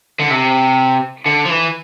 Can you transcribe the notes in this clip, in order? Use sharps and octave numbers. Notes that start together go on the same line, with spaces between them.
D3
C3
D3
F3
E3